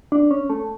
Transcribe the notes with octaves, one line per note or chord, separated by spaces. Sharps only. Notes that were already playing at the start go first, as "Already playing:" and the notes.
D4
C#4
A3